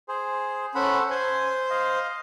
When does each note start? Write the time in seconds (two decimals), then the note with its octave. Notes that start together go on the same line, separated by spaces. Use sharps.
0.08 G#4 C5
0.75 C#4 A4 C5 F#5 B5
1.11 C5 G#5
1.70 D#5 F5